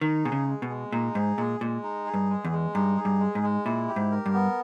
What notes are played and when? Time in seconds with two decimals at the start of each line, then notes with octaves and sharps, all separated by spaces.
0.01 D#3 D#4
0.24 B2 G#4
0.32 C#3
0.47 G#3
0.62 B2
0.70 G#3
0.92 A#2 D#4
1.15 G#2 G#4
1.37 A#2 G#3
1.61 A#2 G#3
1.84 D#4
2.06 G#4
2.14 G2
2.30 G#3
2.44 E2
2.52 G#3
2.74 G2 D#4
2.97 G#4
3.05 G2
3.20 G#3
3.35 G#2
3.43 G#3
3.65 A#2 E4
3.88 G4
3.96 G#2
4.11 A#4
4.26 G2
4.34 B3